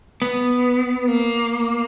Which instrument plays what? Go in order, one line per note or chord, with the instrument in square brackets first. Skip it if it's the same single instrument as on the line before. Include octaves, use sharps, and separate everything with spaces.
[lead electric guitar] B3
A#3